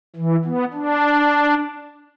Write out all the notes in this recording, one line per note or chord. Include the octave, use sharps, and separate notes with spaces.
E3
B3
D4